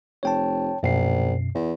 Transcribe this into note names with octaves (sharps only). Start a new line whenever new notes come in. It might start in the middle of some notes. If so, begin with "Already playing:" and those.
F1 C#5 G5 A5
A#1 F#2 B2 C7
E2